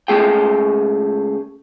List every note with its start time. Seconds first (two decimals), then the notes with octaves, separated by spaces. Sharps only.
0.08 C#2 A3 G#4 G5